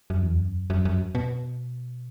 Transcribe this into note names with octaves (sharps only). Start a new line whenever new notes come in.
F#2
E2
F#2
F#2
F#2
B2